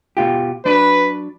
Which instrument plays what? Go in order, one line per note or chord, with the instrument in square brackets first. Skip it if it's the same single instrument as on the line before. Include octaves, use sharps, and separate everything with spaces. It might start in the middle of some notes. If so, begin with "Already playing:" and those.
[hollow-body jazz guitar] B2 F4 G4
[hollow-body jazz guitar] F#3 D4 [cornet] B4